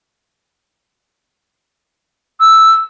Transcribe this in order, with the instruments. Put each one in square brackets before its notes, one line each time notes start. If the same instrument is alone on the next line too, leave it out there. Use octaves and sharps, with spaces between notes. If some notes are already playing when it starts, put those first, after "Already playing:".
[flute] E6